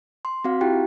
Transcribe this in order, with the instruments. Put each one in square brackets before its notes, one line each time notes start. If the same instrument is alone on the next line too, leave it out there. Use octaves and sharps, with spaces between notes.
[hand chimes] C6
C4 F#4 F5
E4 F4 G4 G5